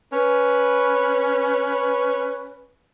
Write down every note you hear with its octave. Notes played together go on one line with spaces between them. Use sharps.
C#4 B4